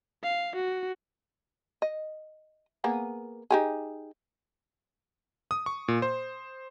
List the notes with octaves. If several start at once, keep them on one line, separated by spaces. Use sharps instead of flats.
F5
F#4
D#5
A#3 B3 G#4
D#4 G4 G#4
D#6
C#6
A#2
C5